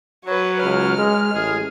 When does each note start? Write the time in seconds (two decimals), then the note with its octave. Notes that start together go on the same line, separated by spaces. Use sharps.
0.25 F#3 B4 C#5
0.62 C#2 F6
0.98 G#3
1.34 A1 G#4